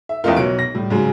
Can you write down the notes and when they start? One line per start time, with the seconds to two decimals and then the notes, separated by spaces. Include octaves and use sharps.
0.09 E5
0.24 E2 A3 F4 A#4 D#5 G5
0.36 B1 F#3 D7
0.59 A#6
0.75 A2 G3
0.90 G#2 C#3 F#3